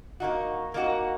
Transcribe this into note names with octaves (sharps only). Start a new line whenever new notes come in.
A#3 D#4 F#4
A#3 D#4 F#4